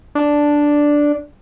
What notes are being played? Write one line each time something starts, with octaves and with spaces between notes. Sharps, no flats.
D4